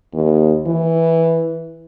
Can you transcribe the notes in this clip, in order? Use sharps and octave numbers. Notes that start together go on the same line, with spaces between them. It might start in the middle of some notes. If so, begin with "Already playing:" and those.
D#2
E3